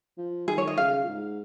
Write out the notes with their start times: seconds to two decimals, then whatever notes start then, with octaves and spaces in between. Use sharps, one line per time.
0.17 F3
0.48 D#3 G#4
0.58 C#5
0.67 D#5
0.77 C#3 F5
1.03 A#2
1.08 G#2